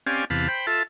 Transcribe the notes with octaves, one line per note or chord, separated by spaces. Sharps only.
C4 C#4 G4 D5 F5 G#5
E2 C3 F5 A5 B5
C5 G5 B5
F4 A4 E5 A5